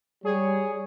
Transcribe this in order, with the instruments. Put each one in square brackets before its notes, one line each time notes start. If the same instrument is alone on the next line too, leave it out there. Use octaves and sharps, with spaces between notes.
[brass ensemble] G3 C#5 [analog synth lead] G#4